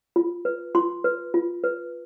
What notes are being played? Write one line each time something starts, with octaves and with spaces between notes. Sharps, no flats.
F4
B4
F4 C6
B4
F4
B4